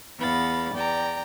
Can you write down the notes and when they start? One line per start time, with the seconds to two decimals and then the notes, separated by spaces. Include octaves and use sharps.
0.20 E2 B3 F5 B5 A6
0.73 E2 D5 G5 A#5